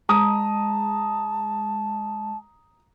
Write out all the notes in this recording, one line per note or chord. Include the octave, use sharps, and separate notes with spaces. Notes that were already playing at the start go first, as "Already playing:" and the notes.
G#3 A5 A#5 D#6